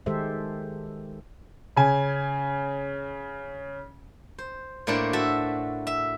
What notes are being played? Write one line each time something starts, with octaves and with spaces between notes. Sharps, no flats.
D#3 G#3 G4 A4 C5 E5
C#3 G#5
C5
A2 A3 A#3 D4 C5 D5
F#4 A4 E5
E5